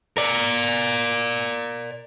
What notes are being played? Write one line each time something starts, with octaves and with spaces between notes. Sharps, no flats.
A#4 D5